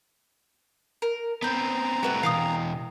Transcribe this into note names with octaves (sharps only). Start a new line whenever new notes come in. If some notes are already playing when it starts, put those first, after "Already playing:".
A#4
B3 C4 B4 G5 A#5
G3 A3 C4 F#4 B4 G5
B2 E3 F5 G5 D#6